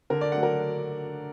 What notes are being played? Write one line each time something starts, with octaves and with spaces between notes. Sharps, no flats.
D3 A#4
D5
F#3 A3 D4 F#5
A#4